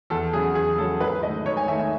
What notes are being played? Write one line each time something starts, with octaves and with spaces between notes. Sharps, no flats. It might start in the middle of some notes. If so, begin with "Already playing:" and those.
E2 A4
C#3 F#3 G#4
E2 G#4
C#3 F#3 A4
G#2 B4
D#3 A3 D#4 D#5
G#2 C#5
G#5
D#3 A3 D#4 E5
E5